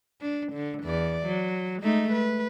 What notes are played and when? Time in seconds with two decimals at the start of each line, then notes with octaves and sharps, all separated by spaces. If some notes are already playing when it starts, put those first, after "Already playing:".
0.21 D4
0.53 D3
0.84 E2 D5
1.26 F#3
1.83 G#3 A3 D#4
2.12 B4